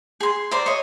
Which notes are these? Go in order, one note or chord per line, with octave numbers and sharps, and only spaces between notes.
G#4 C6
A#4 C5 D5 C6
C#5 D#5